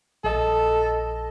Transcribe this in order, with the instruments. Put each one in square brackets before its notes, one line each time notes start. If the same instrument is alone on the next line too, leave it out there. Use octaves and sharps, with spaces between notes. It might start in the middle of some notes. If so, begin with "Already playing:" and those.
[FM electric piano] A#1 D#5 [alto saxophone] A4